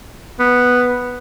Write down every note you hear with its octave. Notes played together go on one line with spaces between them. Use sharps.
B3